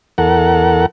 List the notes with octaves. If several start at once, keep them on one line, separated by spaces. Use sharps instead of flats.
E2 A4 A#4 F#5